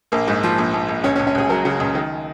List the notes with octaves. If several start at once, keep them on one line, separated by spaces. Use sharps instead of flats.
A#1 A#3
G#2
F3
A#1
A#1
A#1
C#2 C#4
C#4
C#2
C#4
C#2 G#4
F#3 A#4
C#3
C#2
D#3